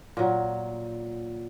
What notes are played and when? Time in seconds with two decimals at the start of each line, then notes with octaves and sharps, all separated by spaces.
0.17 A#2 F#3